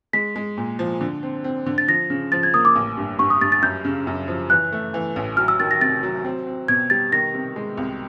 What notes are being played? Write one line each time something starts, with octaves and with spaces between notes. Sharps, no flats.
G#3 B6
G#3
A#2
F3
D3
C4
C4
D3
A6
F3 A#6
C#3
F3 A6
G#6
A#3 D#6
D6
A1
G2
G2 C#6
D#6
G2 A6
A6
F#2 G6
C#3
F#2
F3
E3 F#6
A3
E3
A1
F#3 F6
E6
D#3 A6
A#6
C3 A6
F#3
C4
C4
B2 G#6
G3 A6
D#3 A#6
C3
G#3
C2